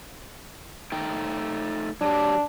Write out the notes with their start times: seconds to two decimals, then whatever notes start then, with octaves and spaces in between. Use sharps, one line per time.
0.92 A3 D#4 G5
2.01 F#3 D4 G4